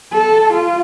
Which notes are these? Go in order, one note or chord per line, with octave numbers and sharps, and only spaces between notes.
A4
F4